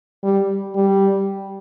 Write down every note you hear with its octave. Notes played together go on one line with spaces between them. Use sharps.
G3
G3